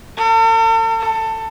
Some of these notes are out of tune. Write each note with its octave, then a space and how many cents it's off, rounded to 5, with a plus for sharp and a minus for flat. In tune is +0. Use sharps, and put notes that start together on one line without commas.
A4 +45
A4 +20